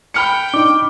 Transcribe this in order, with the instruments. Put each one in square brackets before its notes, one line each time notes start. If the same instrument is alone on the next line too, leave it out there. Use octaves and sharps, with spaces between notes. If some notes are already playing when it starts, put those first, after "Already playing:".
[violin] G5 [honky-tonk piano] B5 F6 C#7
[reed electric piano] D4 D#4 [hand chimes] D6